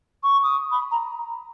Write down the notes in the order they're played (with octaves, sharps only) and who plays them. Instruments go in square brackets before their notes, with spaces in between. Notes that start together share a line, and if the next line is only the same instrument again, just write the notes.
[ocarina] C#6
D#6
B5
A#5